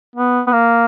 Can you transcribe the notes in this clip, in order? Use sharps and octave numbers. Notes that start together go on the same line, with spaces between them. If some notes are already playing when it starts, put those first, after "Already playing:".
B3
B3
A#3